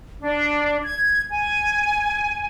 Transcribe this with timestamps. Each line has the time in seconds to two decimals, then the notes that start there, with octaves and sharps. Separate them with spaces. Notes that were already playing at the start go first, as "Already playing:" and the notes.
0.22 D4
0.84 G#6
1.30 G#5